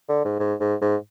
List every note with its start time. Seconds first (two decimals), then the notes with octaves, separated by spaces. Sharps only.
0.09 D3
0.25 G#2
0.40 G#2
0.60 G#2
0.81 G#2